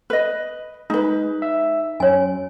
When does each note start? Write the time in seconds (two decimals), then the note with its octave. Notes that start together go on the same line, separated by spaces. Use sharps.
0.10 B4 D#5
0.90 G#3 D#4 B4
1.42 E5
2.00 F#2 C#5 G#5